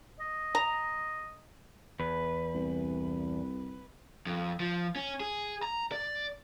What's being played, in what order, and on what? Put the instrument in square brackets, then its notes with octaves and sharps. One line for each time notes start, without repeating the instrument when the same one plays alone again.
[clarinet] D#5
[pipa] A#5
[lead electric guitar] E2 [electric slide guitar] B4
[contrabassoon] C2
[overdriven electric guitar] F2
F3
C#4
G#4
A#5
D5